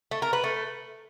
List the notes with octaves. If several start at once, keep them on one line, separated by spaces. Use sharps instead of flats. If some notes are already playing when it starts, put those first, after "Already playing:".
A3
A#4
B4
A3